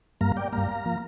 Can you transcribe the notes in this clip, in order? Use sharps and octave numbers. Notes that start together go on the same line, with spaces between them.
G2 G3 A#3 F5 A#5
D5 G5
G2 G3 A#3 F5 A#5
F3 A#3